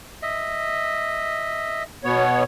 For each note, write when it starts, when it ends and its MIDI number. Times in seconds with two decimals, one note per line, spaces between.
0.22 1.83 75
0.22 1.83 76
2.04 2.43 47
2.04 2.43 59
2.04 2.43 73